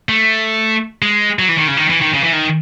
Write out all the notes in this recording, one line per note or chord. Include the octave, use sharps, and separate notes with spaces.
A3
G#3
F#3
E3
D#3
C#3
D#3
E3
D#3
C#3
E3
D#3